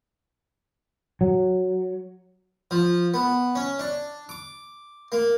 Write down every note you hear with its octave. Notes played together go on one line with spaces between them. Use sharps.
F#3
F3
B3
C#4
D4
D6
A#3